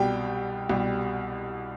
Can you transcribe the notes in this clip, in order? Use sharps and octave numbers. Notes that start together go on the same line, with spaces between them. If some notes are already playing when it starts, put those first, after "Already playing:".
Already playing: C2 B2 G3 G5
C2 B2 G3